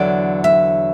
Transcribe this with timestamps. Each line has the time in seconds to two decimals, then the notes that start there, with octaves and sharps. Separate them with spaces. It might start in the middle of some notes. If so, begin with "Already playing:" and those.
Already playing: E2 D3 F#3 D5
0.44 E5